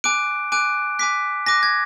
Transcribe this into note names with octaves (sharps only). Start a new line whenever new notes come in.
G#5 D6 F#6 D7
G#5 D6 F#6 D7
G#5 D6 F#6 B6
G#5 D6 F#6 A#6
G#6